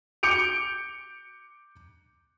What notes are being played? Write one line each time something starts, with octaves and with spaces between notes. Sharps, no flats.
D6 G6 C#7 D7 F7